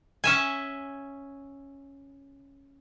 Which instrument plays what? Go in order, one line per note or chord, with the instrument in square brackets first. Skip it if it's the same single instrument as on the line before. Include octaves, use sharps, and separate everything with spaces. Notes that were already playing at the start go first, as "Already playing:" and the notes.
[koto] C#4 E5 G#5